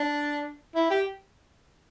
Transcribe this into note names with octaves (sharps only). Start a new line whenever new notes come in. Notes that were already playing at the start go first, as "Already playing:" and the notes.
Already playing: D4
E4
G4